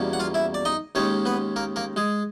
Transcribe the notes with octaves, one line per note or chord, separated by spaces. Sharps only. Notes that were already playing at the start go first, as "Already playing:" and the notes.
Already playing: E2 B2 G3 A#3 C#4
F#5
F4 F5
E4 E5
D5
D#4 D#5
D#2 D#3 G#3 C#4 C#5
B3 B4
A#3 A#4
A#3 A#4
G#3 G#4